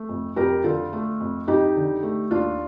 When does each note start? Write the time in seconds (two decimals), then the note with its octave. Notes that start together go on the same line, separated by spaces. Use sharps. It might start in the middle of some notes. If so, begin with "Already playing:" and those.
Already playing: A3
0.09 F2
0.36 F2 G4 A#4
0.64 D3 F4 A4
0.93 A3
1.20 F2
1.47 F2 D#4 G4
1.76 D3
2.03 A3
2.31 D#2 D4 F4